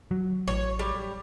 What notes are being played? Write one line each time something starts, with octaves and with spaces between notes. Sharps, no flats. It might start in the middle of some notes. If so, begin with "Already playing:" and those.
F#3
A1 C#5
G3